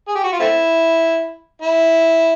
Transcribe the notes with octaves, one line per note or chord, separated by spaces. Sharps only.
G#4
G4
F#4
F4
A3 C4 E4
E4